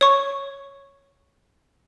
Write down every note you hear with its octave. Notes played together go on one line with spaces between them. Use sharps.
C#5 C#6